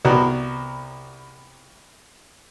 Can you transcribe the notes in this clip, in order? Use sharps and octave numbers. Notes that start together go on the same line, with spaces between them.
C2 B3 F#4 A#4